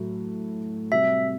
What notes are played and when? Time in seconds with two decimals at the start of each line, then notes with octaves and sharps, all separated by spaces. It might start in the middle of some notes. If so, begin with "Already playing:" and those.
Already playing: A2 F#3 A3 F#4
0.91 C3 G3 C4 F#4 E5